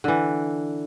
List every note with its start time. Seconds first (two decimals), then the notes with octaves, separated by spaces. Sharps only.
0.04 D3 E3